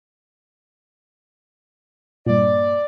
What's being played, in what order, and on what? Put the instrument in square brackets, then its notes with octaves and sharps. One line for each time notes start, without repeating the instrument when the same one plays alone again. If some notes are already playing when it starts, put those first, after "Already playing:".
[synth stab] G2 A#2 [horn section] D5